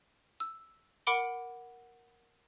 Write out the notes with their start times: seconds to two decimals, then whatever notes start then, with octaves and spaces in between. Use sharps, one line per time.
0.40 E6
1.07 A#4 F#5 B5 D6 D7 G7